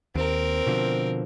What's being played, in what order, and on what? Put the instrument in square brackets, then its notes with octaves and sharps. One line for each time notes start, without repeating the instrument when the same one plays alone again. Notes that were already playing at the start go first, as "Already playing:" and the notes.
[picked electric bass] D#2 [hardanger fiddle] C4 A#4
[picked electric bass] B2 D3 F3